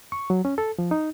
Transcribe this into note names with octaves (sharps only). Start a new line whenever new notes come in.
C#6
F#3
C#4
A4
F3
D#4